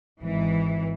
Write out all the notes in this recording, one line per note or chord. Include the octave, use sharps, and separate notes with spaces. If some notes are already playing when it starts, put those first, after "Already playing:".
G#1 E3